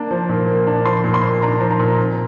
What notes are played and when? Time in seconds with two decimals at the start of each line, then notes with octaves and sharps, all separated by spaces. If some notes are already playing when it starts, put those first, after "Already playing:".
Already playing: A#3 D4
0.11 F3
0.29 A#2
0.48 A#3
0.67 D4
0.85 F3 C6
1.04 A#2
1.14 C6
1.23 A#3
1.42 D4 A#5
1.60 F3
1.71 A#5
1.79 A#2
1.98 C4